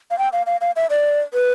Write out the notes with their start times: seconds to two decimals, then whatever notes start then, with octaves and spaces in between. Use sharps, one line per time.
0.11 F5
0.19 G5
0.33 F5
0.46 F5
0.61 F5
0.76 E5
0.90 D5
1.34 B4